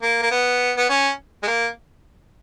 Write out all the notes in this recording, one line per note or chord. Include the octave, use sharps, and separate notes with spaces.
A#3
A#3
B3
B3
C#4
G#3
A#3